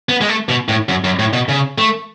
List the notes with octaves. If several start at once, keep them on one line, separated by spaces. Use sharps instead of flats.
B3
G#3
A3
B2
A2
F#2
F#2
A2
B2
C#3
A3